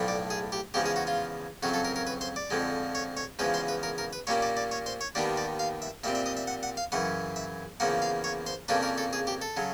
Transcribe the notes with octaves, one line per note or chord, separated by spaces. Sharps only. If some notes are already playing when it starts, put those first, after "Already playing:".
Already playing: B1 A2 F3 A3 D4
D5
G#4
G4
E2 C#3 F3 G#3 G4
G#4
F#4
F4
F2 C#3 F#3 F#4
A4
A#4
A#4
B4
C5
D5
F2 D3 F3 G#3
C#5
C#5
E2 C#3 F3 G#3 B4
C5
B4
A#4
A#4
B4
A#2 G3 A#3 C#4 C#5
D5
D5
C#5
C5
C#5
D#2 D#3 G3 B3 D4 D5
D5
F5
E5
A#2 G3 C4 E5
E5
D#5
E5
F#5
F#5
F5
F#2 C#3 E3 F#5
E5
E2 C#3 F3 A#3 F#5
F5
C#5
C5
F2 C#3 F3 A#3 D4 B4
A#4
A4
G#4
G4
A4
C#3 F#3